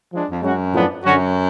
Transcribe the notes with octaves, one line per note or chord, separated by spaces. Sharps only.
F3 G#3 D4
F2
F#2 G#3 C#4 F#4
A2 F3 B3 D4
F#2 D3 F#3 C#4 F#4